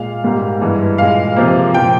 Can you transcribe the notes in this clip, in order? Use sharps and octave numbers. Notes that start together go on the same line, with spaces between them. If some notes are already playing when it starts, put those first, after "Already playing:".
Already playing: A#2 G#3 F5
G#2 G3 A#3
G2 E3 G#3
A#2 G#3 F5
C3 F3 A#3
A#2 F3 A#3 G5